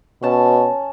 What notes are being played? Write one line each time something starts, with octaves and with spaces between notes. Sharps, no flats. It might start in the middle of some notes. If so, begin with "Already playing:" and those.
B2 C#4 A5